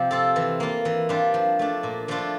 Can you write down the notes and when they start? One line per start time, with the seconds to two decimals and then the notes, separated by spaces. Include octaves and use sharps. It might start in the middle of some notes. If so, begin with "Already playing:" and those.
Already playing: C3 F3 G4
0.11 C4 F4 A4
0.36 E3
0.60 A#3 F4
0.85 E3
1.09 G3 D4 F4
1.34 F3
1.59 A3 D4
1.83 A#2
2.08 F3 A3 D4 F4